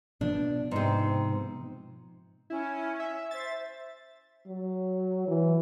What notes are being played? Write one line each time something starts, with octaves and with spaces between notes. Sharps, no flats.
B2 F3 B3 D4
G#2 C3
C#4 E4
E5
C5 E5 A6
F#3
E3